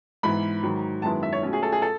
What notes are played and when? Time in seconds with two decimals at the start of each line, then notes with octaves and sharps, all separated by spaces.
0.23 G#2 E3 B3 B5
0.63 G#2 D#3 F#3
1.02 F#2 D#3 G#3 B3 E4 A5
1.23 E5
1.32 C#5
1.42 B2 A3 C#4
1.53 G#4
1.63 A4
1.72 G#4
1.82 A4